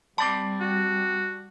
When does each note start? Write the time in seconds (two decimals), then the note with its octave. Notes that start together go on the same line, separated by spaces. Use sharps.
0.18 G3 C4 D5 A5 B5 D6
0.60 F#4